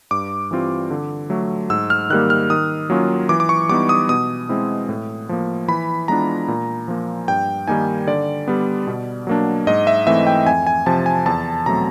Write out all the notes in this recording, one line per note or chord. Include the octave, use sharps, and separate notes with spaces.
G2 D6
E3 G3 C4 F4
D3
F#3 A3
G#2 E6
F6
D#3 G3 A#3 F#6
F6
D#3 D#6
F#3 A#3 C#4 F4
E3 D6
D6
C#6
G3 B3 D#4 D6
D#6
B2 D#6
G#3 C4 E4
A2
F3 A#3
E3 B5
G#3 B3 D4 F4 A#5
A#2
F3 A#3
G2 G5
D#3 G3 A#3 D#4 G#5
D3 D5
G3 B3
B2
F#3 A#3 D4
G#2 D#5
E5
E3 A3 C4 E5
G5
F2 G#5
G#5
C3 F3 A5
G#5
E2 A5
B2 F#3 A3 C4 A#5